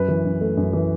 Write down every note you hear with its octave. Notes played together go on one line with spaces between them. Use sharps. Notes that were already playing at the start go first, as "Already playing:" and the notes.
Already playing: F#2 B4
E3
F#2
A3
F#2
E3